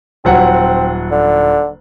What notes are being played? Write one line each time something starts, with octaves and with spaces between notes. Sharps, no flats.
D#1 F#3 C4 F#5
D3